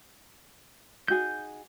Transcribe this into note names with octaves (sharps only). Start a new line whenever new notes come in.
D#4 F#4 G#4 G6